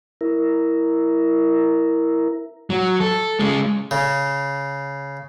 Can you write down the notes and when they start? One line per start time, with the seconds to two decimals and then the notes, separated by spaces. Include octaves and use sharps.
0.21 E4 A#4
2.70 F#3
3.00 A4
3.40 C#3 G#3
3.91 C#3